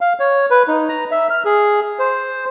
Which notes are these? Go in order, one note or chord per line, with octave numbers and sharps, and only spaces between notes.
F5
C#5
B4
D#4
A#5
E5
F6
G#4
C5